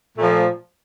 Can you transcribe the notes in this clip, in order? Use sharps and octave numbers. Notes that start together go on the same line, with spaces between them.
A#2 F3 A3